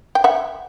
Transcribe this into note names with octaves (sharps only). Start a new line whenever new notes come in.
G5
E5 F#5